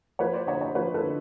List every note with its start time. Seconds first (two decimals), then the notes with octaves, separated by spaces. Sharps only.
0.19 F3 B4 C#5
0.33 C5 D5
0.47 D3 C#5 D#5
0.61 C#5 D#5
0.75 F3 B4 C#5
0.94 A4 B4
1.03 D3